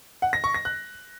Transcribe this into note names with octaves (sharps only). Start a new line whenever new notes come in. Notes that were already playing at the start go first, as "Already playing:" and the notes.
F#5
A#6
C#6
A#6
F#6